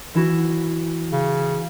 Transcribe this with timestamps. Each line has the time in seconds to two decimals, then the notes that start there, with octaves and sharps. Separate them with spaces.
0.14 E3 E4 F#4
1.12 C#3